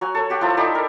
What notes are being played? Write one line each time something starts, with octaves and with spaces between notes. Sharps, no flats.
F#3 F#4 G#5
A4 C#5
F#4 G4 F#5
F3 E4 A4
D#4 E4 G4 D5
A#4